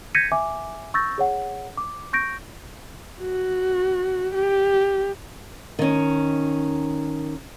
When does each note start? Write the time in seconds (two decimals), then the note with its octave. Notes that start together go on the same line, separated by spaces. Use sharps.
0.15 G6 G#6 A#6 B6 C#7 D#7
0.32 E5 G#5 D6
0.94 C#6 E6 G6 A6 A#6
1.18 G#4 C#5 F#5
1.77 D6
2.13 C#6 G6 A#6 D7
3.21 F#4
4.34 G4
5.79 D#3 C#4